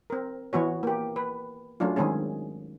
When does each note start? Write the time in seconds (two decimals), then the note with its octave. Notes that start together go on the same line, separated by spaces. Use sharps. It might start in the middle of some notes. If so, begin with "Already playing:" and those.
0.10 C4 A#4
0.53 E3 B3 F#4 C#5
0.83 A#3 G4
1.16 B4
1.80 F#3 A3 C#4 D4 F4
1.96 D#3 G#3 C4 C#4 G#4